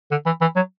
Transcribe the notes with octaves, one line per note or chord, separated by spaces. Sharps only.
D3
E3
E3
F#3